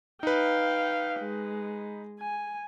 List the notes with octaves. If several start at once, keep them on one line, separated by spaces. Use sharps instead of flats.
D#4 B4 F5 G5
G#3
G#5